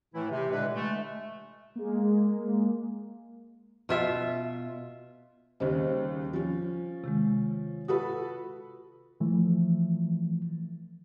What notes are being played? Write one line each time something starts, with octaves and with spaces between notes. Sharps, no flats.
A2 E3 A3 E4
C3
A#2 D3 E3 G#3 D4 B4
G#3 A3
G#3 A#3
B2 F4 E5
D#2 C#3 G3 C5 D#5
F3 C#4
C3 D#3 G#3
F4 F#4 A4 B4 D#6
E3 F3 A3